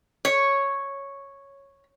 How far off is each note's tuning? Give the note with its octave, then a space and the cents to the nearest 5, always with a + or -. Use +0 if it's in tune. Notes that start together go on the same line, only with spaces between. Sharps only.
C#5 -5